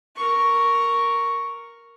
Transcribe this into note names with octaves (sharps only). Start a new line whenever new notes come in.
A#4 C#6